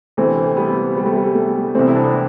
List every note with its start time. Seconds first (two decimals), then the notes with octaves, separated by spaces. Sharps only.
0.17 D2 C3 E3 A3 C4
0.57 G3 B3
0.97 G3
1.06 A3
1.16 G3
1.35 A3
1.74 C2 C3 E3 A3 C4
1.88 E4
1.95 B3 D4